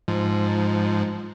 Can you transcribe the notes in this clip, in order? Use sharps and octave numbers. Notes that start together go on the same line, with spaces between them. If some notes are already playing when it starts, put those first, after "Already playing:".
G#2 F3